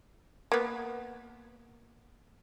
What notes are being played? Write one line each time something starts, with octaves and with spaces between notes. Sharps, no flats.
A#3 B3